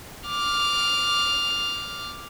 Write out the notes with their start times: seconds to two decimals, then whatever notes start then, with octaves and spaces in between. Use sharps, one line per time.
0.28 D6 F6